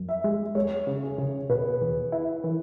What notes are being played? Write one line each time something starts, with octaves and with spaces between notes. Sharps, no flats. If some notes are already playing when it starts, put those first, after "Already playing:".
Already playing: F#2
E5
G#3
G#3 C#5
C#3
G#4
C#3
B2 B4
E2
E4
E3